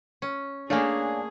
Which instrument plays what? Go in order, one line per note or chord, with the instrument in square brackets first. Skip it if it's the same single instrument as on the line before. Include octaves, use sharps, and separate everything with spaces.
[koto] C#4
[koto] A3 A#3 [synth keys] D4 [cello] G#4 [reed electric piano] C#5 F5 G#5